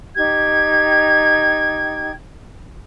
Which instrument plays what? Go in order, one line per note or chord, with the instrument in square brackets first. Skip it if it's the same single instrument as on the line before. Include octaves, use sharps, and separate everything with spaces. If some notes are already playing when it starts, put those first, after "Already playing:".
[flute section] D#4 G4 G5 G#6